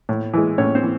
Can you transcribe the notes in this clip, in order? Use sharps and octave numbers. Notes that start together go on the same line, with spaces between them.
A2
E3 G#3
A2 C#4 C#5
C4 C5
E3